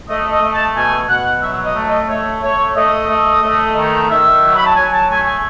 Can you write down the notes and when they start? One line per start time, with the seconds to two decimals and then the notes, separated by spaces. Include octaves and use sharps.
0.09 A3 D#5
0.32 D#5
0.42 A3
0.53 A5
0.75 B2 G#5
1.09 B2 F#5
1.42 F#3 E5
1.65 D#5
1.76 A3
1.86 D#5
2.09 A3 C#5
2.42 A3 C#5
2.76 A3 D#5
3.09 A3
3.43 A3
3.76 D#3
4.10 D#3 E5
4.43 F#3
4.56 B5
4.66 A5
4.75 F#3 G#5
4.93 A5
5.09 A3 G#5
5.26 G#5